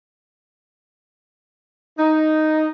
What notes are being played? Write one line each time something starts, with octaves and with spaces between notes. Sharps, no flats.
D#4